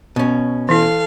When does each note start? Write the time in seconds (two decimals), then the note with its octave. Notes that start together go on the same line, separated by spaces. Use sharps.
0.16 B2 C#4
0.69 E3 E4 A4 F5